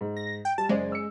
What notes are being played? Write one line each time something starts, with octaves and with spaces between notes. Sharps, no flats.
G#2
A#6
G5
G3 A5
F#1 G#3 C5 D5
E6 C#7